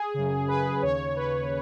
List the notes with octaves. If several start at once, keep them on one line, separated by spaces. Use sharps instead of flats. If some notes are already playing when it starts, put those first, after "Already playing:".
Already playing: G#4
F#2 C#3
B4
D#2 C#3 C#5
B4